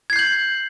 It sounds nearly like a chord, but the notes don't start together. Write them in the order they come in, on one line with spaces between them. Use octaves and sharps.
G#6 C7 G6 F#7